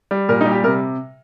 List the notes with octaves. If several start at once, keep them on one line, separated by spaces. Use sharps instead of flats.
G3
A#2 A#4
D#4
G3
G4
C3 A#4